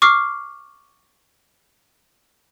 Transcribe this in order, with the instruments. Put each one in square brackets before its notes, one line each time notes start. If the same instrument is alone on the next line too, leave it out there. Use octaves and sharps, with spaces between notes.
[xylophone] C#6 D6 F6 C7